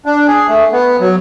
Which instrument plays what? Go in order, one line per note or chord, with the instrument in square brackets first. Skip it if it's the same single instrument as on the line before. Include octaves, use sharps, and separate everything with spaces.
[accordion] D4
G#4
A3
B3
F#3